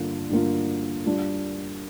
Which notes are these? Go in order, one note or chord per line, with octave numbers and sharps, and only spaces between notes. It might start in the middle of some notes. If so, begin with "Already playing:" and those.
Already playing: G2 D3 A#3 F4
G2 D3 A#3 F4
G2 G3 D4 F4